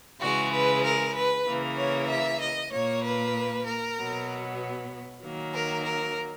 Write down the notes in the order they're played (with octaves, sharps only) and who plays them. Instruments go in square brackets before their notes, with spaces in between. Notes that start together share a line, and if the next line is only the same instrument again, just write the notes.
[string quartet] C#3 E3 G#3 F#4
B4
A#4
B4
C#3 E3 A#3
C#5
E5
D#5
A#2 A#3 C#5
B4
A#4
B2 F#3 B3
D#3 F#3 A#3
A#4
A#4